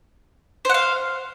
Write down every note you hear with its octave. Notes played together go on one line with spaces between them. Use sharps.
C5 F5 F#5